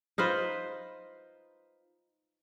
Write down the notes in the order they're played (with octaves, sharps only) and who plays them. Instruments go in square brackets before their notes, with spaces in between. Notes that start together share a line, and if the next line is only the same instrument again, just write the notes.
[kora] D#4 F4 B4 C5